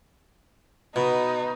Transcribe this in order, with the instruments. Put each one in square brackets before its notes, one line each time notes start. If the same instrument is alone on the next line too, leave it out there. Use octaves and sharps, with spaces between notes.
[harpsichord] B2 [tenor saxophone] B3 [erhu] D#4